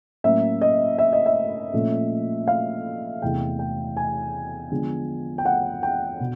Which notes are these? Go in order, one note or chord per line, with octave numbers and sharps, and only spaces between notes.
A2 F#3 A#3 C#4 E5
D#5
E5
D#5
E5
A#2 F3 A3 C#4
F5
E2 C3 E3 A3 G5
G5
G#5
D3 F3 G#3 B3 D4
G5
F#5
G5
B2